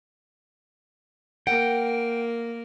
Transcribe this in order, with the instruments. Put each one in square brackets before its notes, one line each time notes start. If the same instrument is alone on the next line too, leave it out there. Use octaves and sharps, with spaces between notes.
[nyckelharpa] A#3 A#4 [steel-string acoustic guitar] F#5 [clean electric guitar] G5